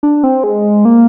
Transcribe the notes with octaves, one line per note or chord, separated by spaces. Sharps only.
D4
C4
G#3
A#3